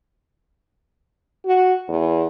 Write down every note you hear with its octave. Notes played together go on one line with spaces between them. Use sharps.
F#4
E2